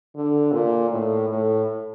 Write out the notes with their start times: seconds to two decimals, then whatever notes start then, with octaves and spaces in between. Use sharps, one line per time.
0.15 D3
0.52 A#2
0.90 A2
1.29 A2